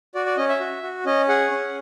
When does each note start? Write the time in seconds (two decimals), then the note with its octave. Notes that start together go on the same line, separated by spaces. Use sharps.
0.15 F#4 D5
0.26 D5
0.37 C#4 D#5
0.49 E5
0.60 F#4
0.83 F#4
1.06 C#4 D#5
1.28 G#4 F#5
1.51 C#4